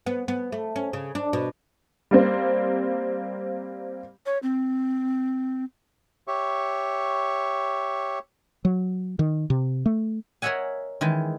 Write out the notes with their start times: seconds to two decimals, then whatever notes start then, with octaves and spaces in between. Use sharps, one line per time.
0.06 B3
0.28 B3
0.52 A3
0.76 C#4
0.93 C#3
1.15 D4
1.33 B2
2.11 G3 A#3 C4
4.26 C#5
4.43 C4
6.28 G4 C#5 E5 C#6
8.65 F#3
9.19 D#3
9.50 C3
9.86 A3
10.42 A#4 C#5 D#5 E5 F#5 G#5
11.01 D#3 E3 G#3